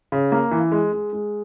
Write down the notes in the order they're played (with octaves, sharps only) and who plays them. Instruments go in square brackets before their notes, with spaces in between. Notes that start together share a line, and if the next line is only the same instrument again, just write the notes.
[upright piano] C#3
A#3
E3
G#3
G#3
G#3